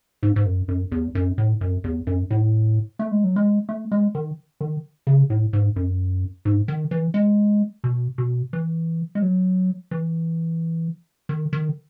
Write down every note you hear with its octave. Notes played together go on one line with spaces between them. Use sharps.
G#2
G#2
F#2
F#2
E2
F#2
A2
F#2
E2
F#2
A2
A3
G#3
F#3
G#3
A3
G#3
D#3
D#3
C#3
A2
G#2
F#2
G#2
D#3
E3
G#3
B2
B2
E3
G#3
F#3
E3
D#3
D#3